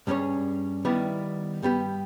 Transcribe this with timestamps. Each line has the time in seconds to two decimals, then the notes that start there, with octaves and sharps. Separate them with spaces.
0.07 G2 G3 C#4 G#4 C#5
0.85 D#3 G3 B3 E4
1.62 G2 G3 B3 G4